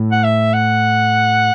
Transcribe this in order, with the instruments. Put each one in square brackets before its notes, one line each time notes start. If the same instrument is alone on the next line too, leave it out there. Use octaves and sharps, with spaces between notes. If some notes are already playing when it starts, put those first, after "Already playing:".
Already playing: [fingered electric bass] A2
[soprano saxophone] F#5
E5
F#5